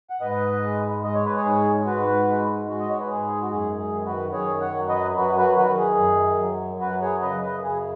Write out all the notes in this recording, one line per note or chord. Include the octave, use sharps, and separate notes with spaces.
F#5
G#2 B4 D#5
G#3
G#3 D#5
C#5
B4
G#4 C#5
G#2
G#2 F#4 B4
G#3
G#3 F#4
D#5
C#5
B4
G#2 G#4
F#4
F#2 G#4
G#4
D#3
F#4 B4
F#2 G#4 C#5
C#5 F#5
F#3
B4 D#5
F#2 F#4 B4
F#4 B4
D#3 F#4 B4
G#4
F#2
F#3
F#2 F#4 B4
G#4 C#5
C#3 B4 D#5
B4 D#5
F#2 G#4